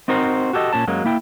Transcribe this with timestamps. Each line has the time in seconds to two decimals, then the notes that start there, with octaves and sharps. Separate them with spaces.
0.08 C4 D#4 F#4 A#4 C5
0.53 F#4 G4 A4 C#5 D#5
0.73 A#2 C#4 A5
0.87 F#2 F#3 G#3 A#3
1.05 A#3 E4 G5